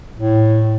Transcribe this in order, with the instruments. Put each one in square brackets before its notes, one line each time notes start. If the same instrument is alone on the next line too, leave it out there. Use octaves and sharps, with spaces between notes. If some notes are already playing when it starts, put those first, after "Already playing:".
[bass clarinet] A2